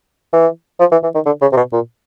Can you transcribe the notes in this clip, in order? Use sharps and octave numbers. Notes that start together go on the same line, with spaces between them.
E3
F3
E3
E3
D#3
D3
C#3
C3
B2
A#2